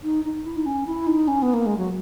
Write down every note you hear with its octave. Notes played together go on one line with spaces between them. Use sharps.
D#4
D#4
E4
D#4
C#4
E4
D#4
C#4
B3
A#3
G#3
F#3